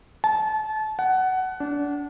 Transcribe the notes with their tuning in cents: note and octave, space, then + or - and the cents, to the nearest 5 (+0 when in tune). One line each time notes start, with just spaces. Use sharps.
A5 -30
F#5 +15
D4 -25